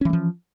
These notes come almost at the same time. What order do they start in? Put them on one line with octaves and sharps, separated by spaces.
C#4 E3 G#3 F3